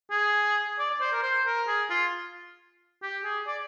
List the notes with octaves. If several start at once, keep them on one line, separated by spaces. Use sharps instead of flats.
G#4
D5
D5
C5
A#4
C5
A#4
G#4
F4
G4
G#4
D5